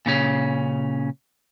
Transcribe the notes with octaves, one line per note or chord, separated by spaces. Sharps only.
A#2 C#3 C#4